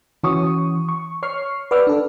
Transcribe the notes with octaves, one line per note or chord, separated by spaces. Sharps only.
E3 C#4 F#4 C#6 D#6
C#6
C#5 C#6 F6 C7
B4 D5 F#5 D6 E6 F6
D4 A4